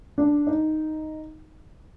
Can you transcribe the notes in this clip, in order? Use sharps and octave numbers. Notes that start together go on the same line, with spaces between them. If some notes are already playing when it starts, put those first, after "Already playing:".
D4
D#4